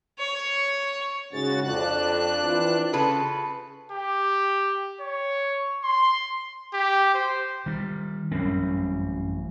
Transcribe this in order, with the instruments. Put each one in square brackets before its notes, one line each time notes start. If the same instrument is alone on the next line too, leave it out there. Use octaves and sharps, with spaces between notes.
[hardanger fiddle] C#5
[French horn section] G#2 C#4 G#4 [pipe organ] C#3 F#4 A6
[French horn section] F2 [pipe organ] D4 F#6
[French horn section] E3 C4 F4
[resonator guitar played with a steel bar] C#3 F4 A4 B4
[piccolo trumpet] G4
C#5
C6
[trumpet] G4
C5
[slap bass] D#3 G3
[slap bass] A1 G3 C4 [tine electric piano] F#2